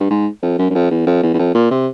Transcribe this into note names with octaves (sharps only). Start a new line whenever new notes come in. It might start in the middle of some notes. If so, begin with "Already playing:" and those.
G2
G#2
F2
F#2
F#2
F2
E2
F2
E2
E2
F2
A#2
C3